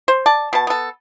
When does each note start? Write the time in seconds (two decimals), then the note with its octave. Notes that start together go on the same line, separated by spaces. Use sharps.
0.08 C5
0.26 D5 A5
0.53 B2 A5
0.67 B3 A4